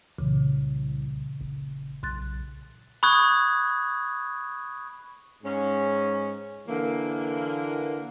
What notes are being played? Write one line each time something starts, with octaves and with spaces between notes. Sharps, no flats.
C2 A#2 C#3 E3
F#1
B1 C6 F#6 A6
B5 C#6 D#6 F#6 G#6
G#2 C#4
D3 E3 A#3